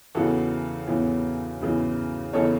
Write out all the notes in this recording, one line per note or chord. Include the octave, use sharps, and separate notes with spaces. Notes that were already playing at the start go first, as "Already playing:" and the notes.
E2 C#3 E3 F#4 A4
E2 C#3 E3
E2 C#3 E3
E2 C#3 E3 A4 C#5